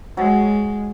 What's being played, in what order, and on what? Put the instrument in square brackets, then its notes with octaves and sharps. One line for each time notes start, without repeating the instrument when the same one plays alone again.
[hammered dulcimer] F#3 [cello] G#3